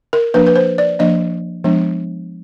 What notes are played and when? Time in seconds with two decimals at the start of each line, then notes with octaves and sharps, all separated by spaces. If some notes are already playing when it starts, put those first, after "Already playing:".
0.13 A#4
0.34 F3 A#3 D4 B4
0.47 B4
0.56 C5
0.78 D5
0.99 F3 A#3 D4 D#5
1.64 F3 G#3 B3 D4